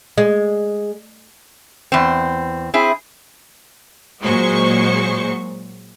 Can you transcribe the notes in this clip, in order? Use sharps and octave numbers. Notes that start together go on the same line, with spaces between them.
G#3
E2 C4
C4 E4 G#4
A#2 F#3 G#3 C5 C#6